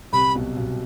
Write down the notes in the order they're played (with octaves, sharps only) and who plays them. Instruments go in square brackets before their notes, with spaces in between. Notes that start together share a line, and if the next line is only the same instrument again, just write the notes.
[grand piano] C2 C3 [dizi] B5
[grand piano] B1 B2
B1 B2